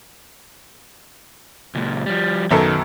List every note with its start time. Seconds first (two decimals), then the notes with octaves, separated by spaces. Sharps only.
1.75 C#2 A#2
2.06 F3 G3
2.51 B1 F#2 D#3 A4